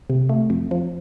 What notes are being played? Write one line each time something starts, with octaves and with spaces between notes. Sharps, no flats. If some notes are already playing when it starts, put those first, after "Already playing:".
C3
A3
F2
F3